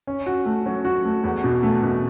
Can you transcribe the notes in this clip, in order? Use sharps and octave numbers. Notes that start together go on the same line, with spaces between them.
C#4
F#4
A3
F#3
F#4
A3
E2
B2
A3
B2